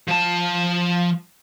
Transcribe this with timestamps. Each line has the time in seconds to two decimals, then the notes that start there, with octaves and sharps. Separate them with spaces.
0.08 F3 A5